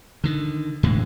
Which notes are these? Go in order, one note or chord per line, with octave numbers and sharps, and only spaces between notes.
D3 D#3
E1 A2 D3 G#3